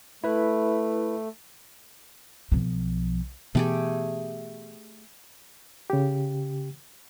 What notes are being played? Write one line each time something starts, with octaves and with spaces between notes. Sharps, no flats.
A3 E4 B4
B1 F3
B2 E3 A3 B3 G4 G#4
C#3 G4